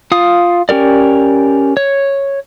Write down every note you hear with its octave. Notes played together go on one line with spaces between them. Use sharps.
F4 F5 D#6
C#4 G4 A#4 D5
C#5